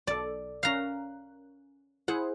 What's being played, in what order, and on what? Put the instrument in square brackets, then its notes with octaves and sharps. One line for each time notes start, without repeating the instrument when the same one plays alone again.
[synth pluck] B1 A4 [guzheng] D5
[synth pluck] C#4 A#4 F#6 [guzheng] F5 A#5
[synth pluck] E4 G#4 C5 [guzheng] F#5